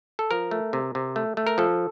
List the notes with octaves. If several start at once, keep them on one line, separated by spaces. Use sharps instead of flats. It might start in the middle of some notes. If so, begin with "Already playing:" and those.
A4
F3 A#4
A3
C3
C3
A3
A3
A#4
F3 A4